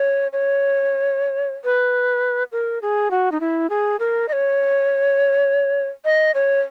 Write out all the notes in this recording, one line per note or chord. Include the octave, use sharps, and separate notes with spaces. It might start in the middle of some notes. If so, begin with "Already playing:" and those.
Already playing: C#5
C#5
B4
A#4
G#4
F#4
D#4
E4
G#4
A#4
D#5
C#5
D#5
C#5